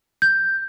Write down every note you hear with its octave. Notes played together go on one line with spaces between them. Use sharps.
G6